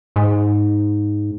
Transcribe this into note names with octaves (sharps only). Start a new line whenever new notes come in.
G#2